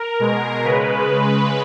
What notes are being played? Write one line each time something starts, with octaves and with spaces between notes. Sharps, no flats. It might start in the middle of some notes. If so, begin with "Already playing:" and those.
Already playing: A#4
B2 G#3
C#3 G#3 B4